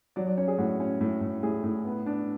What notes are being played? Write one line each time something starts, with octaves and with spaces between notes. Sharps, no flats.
F#3 D5
D5
C#4 C#5
G#4
A2 F#4
C#4
A2
A2
A2 G#4
A2
B3
D4